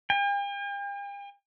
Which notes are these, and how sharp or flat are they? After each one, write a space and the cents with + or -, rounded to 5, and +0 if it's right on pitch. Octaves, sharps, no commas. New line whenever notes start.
G5 +45